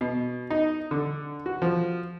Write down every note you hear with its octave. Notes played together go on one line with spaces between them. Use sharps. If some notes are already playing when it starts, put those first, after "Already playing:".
B2
D#4
D3
F#4
F3